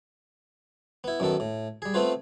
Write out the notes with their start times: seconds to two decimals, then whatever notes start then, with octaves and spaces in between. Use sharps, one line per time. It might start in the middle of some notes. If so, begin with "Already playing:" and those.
1.04 B3 E4
1.20 F#2 D#3 B3 A4
1.40 A2
1.82 G3 G#4
1.94 A3 B3 C4 F4 B4